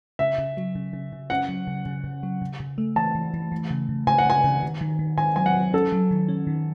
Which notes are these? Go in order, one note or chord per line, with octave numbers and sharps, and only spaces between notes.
C#3 E5
C#3
F#3
C#3
C#3
C#3
C#4 F#5
F#3
C#3
C#3
C#3
F#3
C#3
C#3
A3
E3 A5
E3
E3
E3
C#3
C#3
C#3 G#5
F#5
C#3 G#5
C#3
D#3
D#3
D#3
D#3 G#5
F#3 G#5
F#5
F#3
C#4 A4
F#3
D#3
C#4
D#3